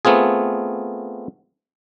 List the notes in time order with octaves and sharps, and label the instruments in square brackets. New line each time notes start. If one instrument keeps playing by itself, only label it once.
[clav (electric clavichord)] A3 B3 C4 F4 G#4